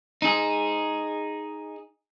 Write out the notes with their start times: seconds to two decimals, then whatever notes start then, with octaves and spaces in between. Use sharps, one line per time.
0.22 D#4 G#4